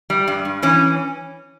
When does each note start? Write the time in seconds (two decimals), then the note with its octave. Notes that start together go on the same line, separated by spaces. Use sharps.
0.10 G3
0.27 G2
0.45 G2
0.63 E3 C#4